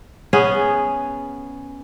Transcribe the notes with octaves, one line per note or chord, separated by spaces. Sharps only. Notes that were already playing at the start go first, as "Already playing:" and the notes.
B3 C#4 G#4